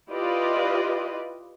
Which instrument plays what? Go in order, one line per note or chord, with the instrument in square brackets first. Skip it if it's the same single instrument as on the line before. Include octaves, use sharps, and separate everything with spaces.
[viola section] E4 F4 G4 B4 D5 D#5